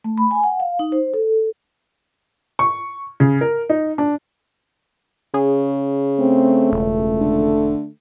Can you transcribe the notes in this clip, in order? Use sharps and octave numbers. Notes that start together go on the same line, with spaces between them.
A3
B5
G#5
F#5
F5
D#4
C5
A4
C#6
C#3
A#4
D#4
D4
C#3 G#4
A3 C4
E1 C#2
D3